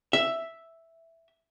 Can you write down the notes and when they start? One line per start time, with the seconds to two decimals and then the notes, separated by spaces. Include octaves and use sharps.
0.13 E5